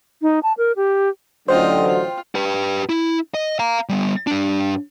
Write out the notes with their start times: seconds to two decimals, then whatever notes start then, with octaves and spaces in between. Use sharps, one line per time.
0.22 D#4
0.43 A5
0.57 A#4
0.76 G4
1.48 A1 D3 F#3 F4 C5 D#5 G5
1.87 F4
2.35 G4 B4
2.89 E4
3.34 D#5
3.59 F5 A#5
3.89 G3 B3
4.27 G2 D4